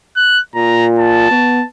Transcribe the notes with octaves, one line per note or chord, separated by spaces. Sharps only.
F#6
A#2 A#5
A5
B3